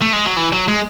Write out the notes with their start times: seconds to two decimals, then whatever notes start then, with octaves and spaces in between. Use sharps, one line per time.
0.02 A3
0.13 G#3
0.26 F#3
0.37 E3
0.53 F#3
0.68 G#3